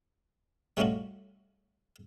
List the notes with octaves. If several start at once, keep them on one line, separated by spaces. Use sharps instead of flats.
G3 A3 C#4 D#4 F4 F#4